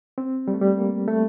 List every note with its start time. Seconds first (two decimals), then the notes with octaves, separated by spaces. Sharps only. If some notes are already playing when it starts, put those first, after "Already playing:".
0.18 C4
0.48 G3
0.54 A3
0.61 G3
0.78 A#3
1.08 A3